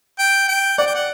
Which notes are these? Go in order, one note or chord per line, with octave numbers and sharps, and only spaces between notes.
G5
G5
D5 F#5
G5
F#5